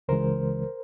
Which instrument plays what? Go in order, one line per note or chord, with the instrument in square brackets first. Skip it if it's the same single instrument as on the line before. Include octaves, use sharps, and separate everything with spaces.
[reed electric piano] C#2 C#3 E3 G#3 A#4 C5